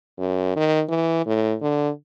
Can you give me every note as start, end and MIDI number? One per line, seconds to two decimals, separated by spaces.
0.19 0.55 42
0.56 0.83 51
0.89 1.22 52
1.26 1.55 45
1.61 1.90 50